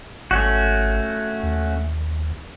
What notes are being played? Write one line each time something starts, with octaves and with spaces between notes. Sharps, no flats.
G#1 A3 C#4 F#4
D#2